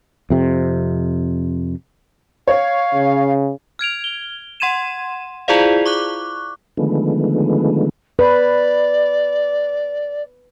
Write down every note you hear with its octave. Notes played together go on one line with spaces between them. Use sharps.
F2 C3
C#5 F5
C#3
F6 G#6 D7 F7
G7
F#5 C6 G#6 D#7 E7
E4 F4 G#4 C5 D5 F5
C#6 D6 F#6
D3 D#3 F3 G#3 A3 B3
B4 D5